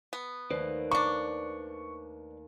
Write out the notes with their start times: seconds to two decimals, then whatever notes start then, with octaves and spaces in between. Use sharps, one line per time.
0.13 B3
0.50 D#2 A3 B4 C5 D5
0.91 A#3 D4 C#6